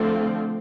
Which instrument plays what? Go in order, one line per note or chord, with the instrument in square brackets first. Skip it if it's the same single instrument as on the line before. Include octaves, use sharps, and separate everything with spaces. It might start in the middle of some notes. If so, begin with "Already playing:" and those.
Already playing: [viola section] D3 F3 A3 C4 F4